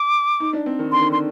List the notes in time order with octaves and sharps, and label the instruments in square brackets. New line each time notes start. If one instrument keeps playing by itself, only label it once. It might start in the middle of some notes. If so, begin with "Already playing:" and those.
Already playing: [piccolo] D6
[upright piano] D#4
D4
C4
D#3
[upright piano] D3 [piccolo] C6
[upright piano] D#3
[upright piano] D3 [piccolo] C6